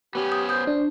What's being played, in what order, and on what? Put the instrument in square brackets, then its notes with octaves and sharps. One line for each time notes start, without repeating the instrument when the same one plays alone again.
[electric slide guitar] B3 C#4 [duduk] G4
[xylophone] D#6 G6
[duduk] C5 [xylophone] D#6 G6
[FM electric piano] D4